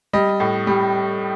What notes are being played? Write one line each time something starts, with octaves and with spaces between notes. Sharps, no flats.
G3 D#5
A2
G3